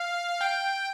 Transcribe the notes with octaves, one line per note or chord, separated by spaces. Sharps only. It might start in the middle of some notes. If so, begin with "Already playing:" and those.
Already playing: F5
G5